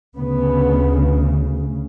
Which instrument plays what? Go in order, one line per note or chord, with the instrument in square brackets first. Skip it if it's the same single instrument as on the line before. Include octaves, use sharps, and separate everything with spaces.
[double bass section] D2 C#3 B3